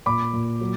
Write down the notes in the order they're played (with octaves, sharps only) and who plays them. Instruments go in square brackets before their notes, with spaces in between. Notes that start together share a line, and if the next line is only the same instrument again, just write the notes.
[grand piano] A#2 B5 D6
A#2
F#3